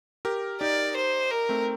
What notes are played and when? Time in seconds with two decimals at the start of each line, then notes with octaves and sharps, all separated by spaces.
0.25 G4 A#4
0.60 D#4 G4 D5
0.96 C5
1.31 A#4
1.49 A3 C4